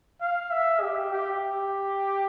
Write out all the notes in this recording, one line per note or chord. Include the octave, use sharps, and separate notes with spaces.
F5
E5
G4
G4